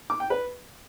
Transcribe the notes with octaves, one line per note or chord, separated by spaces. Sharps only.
D6
G5
B4